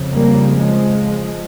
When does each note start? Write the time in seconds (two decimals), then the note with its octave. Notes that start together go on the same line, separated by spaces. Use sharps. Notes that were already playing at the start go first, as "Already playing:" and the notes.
Already playing: F2 C#3
0.13 G3 A#3
0.54 F3 G#3